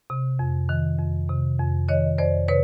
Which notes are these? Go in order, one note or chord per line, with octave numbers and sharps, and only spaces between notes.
C3
F2
D#3
F2
C3
F2
D#3 C#5 D#5
F2 C5 D5
C3 B4 C#5